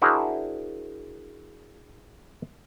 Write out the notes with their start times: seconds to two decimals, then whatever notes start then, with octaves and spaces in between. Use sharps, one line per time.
0.02 D4 E4 F#4 G#4 A#4 C5